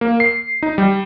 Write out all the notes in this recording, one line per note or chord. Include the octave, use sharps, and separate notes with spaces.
A#3
C7
D#4
G3